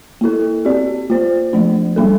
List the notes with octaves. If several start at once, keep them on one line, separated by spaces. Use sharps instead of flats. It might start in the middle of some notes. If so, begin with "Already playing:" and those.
A#3 E4 A4
C4 G4 D5
A#3 F4 C5
F3 A3 D4
G3 A#3 D4 A4